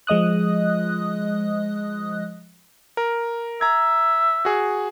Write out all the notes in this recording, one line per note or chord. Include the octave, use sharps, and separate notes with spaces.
F3 G#3 D#5 D#6 F#6
A#4
E5 A#5 G#6
F#4 G#4